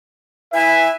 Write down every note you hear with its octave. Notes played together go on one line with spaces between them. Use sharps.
E4 B4 E5 G#5